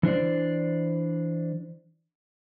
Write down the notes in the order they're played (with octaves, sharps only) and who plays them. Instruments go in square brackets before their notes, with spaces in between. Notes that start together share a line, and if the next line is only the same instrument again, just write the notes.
[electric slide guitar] E3 D4 C5 D5